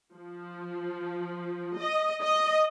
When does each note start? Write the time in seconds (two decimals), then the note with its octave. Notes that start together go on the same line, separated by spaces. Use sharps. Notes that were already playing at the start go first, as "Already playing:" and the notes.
0.15 F3
1.76 D#5
2.23 D#5